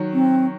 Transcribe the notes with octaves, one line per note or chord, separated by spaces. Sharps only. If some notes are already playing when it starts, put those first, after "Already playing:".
Already playing: D#3 F#3
C4